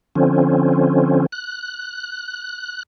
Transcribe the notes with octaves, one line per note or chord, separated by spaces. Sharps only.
D3 F3 C4 C#4
F#6